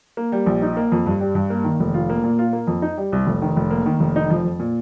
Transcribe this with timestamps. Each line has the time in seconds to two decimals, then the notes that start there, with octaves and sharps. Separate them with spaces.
0.17 A#3
0.32 G3
0.46 A#1
0.62 D#4
0.77 A#3
0.92 F2
1.06 G2
1.21 G3
1.35 G2
1.50 A#3
1.64 D#3
1.80 F1
1.94 F4
2.10 A#3
2.24 A#2
2.39 F4
2.53 A#3
2.67 F2
2.82 D#4
2.97 G3
3.12 C2
3.27 F1
3.42 D#3
3.57 F1
3.71 A#3
3.86 D#3
4.00 F1
4.16 D#4
4.30 F3
4.45 F2
4.59 A#2